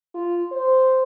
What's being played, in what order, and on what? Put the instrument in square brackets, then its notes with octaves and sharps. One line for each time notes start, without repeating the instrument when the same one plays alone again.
[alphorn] F4
C5